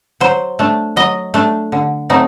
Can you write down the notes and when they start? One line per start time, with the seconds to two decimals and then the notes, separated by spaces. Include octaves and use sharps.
0.20 F#3 C5
0.59 A3 D4
0.96 F#3 D#5
1.34 A3 D4
1.72 D3
2.10 F#3 A3 C4 D#4